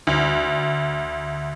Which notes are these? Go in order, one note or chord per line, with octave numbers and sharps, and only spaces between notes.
D2